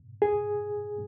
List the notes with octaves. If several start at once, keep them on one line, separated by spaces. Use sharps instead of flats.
G#4